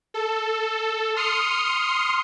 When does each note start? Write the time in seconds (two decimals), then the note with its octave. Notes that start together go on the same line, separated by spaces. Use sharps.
0.14 A4
1.16 C6 D#6 F6 C7 C#7